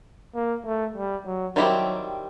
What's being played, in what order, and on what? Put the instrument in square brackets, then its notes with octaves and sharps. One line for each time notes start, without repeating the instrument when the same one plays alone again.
[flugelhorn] A#3
A3
G3
F#3
[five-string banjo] D#3 G3 C4 E4 G4 [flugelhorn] F#3